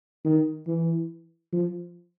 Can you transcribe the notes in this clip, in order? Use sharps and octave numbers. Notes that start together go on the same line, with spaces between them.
D#3
E3
F3